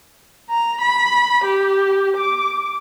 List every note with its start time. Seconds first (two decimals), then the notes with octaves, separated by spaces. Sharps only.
0.50 A#5
0.81 B5
1.44 G4
2.17 D6